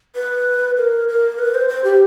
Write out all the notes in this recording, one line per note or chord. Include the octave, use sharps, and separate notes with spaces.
B4
A#4
A#4
B4
C5
C5
G4